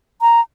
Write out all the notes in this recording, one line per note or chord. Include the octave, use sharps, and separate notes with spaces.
A#5